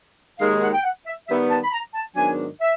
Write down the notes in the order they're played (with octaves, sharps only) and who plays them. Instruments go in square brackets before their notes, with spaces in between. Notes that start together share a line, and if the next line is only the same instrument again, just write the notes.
[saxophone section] D#2 D#3 G#3 [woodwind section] F5
[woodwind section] F#5
G5
F#5
E5
[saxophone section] D#3 G3 B3 [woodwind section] E5
[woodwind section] A5
B5
A#5
A5
[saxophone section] G#2 D#3 F#3 B3 D4 [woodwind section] G#5
[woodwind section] E5